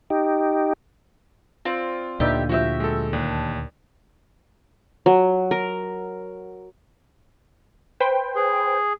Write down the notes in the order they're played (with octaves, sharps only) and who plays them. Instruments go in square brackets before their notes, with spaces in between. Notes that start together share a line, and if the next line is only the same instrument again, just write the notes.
[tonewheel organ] D#4 G4
[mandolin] C4 D5 [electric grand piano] F4
[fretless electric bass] D2 A#2 D3 [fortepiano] D#4 B4 D5 [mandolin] G4 E5
[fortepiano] F3 E4 [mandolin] F#4 G4 E5
[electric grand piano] G#3 A4
[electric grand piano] D#2 [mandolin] D4
[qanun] F#3
A#4
[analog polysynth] B4 C5 G5
[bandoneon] G#4